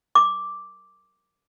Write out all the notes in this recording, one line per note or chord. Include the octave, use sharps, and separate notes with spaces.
D6